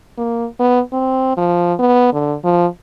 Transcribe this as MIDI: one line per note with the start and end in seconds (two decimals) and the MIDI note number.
0.18 0.46 58
0.60 0.80 59
0.93 1.33 60
1.37 1.74 53
1.79 2.13 59
2.13 2.35 50
2.44 2.67 53